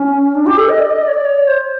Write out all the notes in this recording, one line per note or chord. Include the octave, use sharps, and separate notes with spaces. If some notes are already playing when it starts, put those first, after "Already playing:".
Already playing: C#4
D4
G4
A4
D#5
D5
D#5
D5
C#5
D5
C#5
C5